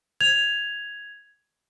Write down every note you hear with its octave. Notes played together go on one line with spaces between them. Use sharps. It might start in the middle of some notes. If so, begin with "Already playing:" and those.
G#6 F7